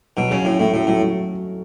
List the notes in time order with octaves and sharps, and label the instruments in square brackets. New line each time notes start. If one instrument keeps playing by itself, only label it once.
[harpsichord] B2 [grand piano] F#3
[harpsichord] C#3 [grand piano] F#3
[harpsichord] A2 [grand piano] C#4
[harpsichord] A2 [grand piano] A3
[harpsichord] A2 [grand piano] F#3
[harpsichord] A2 [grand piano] F#3
[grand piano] F#3